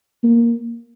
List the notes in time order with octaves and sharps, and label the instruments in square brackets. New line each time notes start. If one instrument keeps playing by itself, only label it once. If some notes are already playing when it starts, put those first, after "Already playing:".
[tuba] A#3